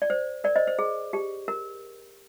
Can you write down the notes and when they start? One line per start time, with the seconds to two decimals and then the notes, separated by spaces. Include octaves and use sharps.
0.02 D5
0.10 C5
0.44 A#4 D5
0.56 C5 D#5
0.67 C5
0.79 G#4
1.13 G4
1.48 A#4